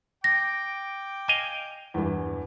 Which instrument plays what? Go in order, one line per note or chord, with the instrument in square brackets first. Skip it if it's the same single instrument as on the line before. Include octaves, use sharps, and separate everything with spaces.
[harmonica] G5 D6 [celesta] A#6
[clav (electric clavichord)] D#5 F5 G#5
[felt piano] E2 G2 E3